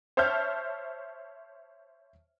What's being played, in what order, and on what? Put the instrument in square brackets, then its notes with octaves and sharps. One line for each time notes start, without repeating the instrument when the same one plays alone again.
[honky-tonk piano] C5 C#5 E5 A5 F6 G6